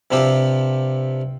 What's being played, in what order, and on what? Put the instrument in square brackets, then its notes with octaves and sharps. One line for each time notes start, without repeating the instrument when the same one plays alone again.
[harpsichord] G2 C3 F3 C4 G4